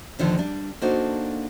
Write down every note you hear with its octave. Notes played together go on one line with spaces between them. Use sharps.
E2 A#2 D3 D#3 F3
G3 D4
A#3 D4 D#4 F#4 A4 C5